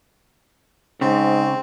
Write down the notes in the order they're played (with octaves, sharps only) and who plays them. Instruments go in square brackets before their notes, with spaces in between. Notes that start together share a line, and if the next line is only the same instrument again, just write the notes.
[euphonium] G#2 [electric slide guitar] C#3 [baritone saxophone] C4